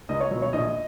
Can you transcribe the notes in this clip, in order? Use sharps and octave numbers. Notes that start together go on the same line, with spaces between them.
C#2 D#5
C#5
B2 F#3
C#5
A#1 D#5